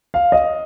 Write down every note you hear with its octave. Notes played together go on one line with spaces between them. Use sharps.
F5
D#5